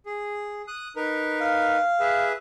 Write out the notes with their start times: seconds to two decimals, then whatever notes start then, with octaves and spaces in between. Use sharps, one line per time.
0.06 G#4
0.68 D#6 F#6
0.96 D#4 A#4 B4
1.40 F5
2.00 G#4 B4 E5